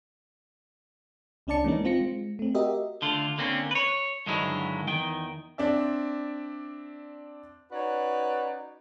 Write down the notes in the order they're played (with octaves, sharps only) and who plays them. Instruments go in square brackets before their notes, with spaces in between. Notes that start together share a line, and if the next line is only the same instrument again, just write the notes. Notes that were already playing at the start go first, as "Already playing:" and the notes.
[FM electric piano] C#2 C#4 D4 D5 A5 C#7
E3 G#3 A#3 C#4 D#4
C4 F4 A#6 C#7
G#3
A3 C4
F#4 G4 A#4 D#5 E5
[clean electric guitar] D3 A3 F4
D3 A#3 C4 C#4
B4 C#5
G2 D3 D#3 F#3 G#3 E4
E2 D#3 G5
[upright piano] C4 D4 D5 E5
[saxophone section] C#4 D#4 F#4 B4 C#5 D5